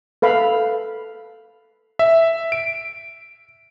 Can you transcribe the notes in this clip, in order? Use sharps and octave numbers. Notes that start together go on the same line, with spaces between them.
A4 B4 F5 B5
E5
D7